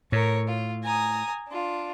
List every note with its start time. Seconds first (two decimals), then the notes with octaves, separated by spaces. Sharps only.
0.12 A2 A#4 C#5
0.48 F4
0.83 G#5 A#5 D#6
1.48 D4 F4